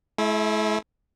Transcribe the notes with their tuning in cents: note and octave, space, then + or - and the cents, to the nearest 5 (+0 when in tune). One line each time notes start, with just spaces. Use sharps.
A3 -45 E4 +0